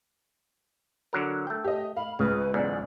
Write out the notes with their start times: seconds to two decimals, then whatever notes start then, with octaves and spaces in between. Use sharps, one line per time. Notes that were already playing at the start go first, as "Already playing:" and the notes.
1.13 D3 F#3 A#4
1.47 A3 G5
1.64 G4 D#5
1.97 F5 B5
2.19 C#2 C#3 B4
2.54 B1 E2 G#2 D5